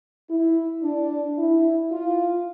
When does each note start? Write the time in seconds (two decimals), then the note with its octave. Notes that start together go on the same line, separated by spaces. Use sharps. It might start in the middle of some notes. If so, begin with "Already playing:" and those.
0.29 E4
0.83 D4
1.38 E4
1.91 F4